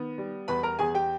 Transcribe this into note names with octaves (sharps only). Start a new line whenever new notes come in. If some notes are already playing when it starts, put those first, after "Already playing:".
Already playing: D#3 B3
G3
E2 B4 B5
A#4 A#5
E2 G#4 G#5
G4 G5